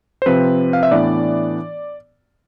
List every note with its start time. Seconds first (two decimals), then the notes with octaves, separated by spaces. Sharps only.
0.22 C5
0.26 C3 F3 C4 B4
0.73 F5
0.83 E5
0.91 A2 E3 B3 D4 D5